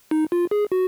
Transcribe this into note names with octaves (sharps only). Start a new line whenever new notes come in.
D#4
F4
G#4
F#4